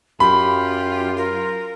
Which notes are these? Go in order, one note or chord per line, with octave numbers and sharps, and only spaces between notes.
F#2 F4 G4 B5
A#4